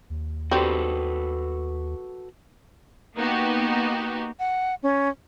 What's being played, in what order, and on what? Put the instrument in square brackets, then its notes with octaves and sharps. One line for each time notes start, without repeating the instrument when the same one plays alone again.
[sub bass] D#2
[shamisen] G3 C4 [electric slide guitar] F#4 A4 B4
[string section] A#3 B3 D#4 F#4 G4
[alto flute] F#5
C#4